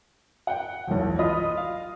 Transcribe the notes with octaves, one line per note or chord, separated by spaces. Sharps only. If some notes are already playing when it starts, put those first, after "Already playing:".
F#5 G5
E1 B1
F4 D#5 B5 D#6
F5